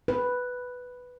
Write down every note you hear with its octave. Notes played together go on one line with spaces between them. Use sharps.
B4